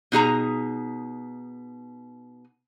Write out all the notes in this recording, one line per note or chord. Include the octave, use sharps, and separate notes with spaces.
B2 D#4 G#4 A#5